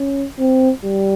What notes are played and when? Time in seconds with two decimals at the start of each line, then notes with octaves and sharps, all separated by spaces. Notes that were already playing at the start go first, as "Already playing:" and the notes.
Already playing: C#4
0.39 C4
0.84 G3